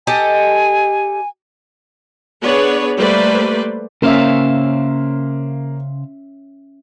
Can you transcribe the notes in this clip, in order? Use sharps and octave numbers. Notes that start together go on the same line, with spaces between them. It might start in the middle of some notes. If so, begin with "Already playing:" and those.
G4 A4 D#5 G#5
B3 D4 G#4 B4 C#5 D5
G3 A3 A#3 B4 C5 D5
C#3 A#3 C#4 C5 E5 F5